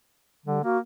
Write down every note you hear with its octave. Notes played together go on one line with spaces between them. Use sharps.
D3 G3
A#3 F#4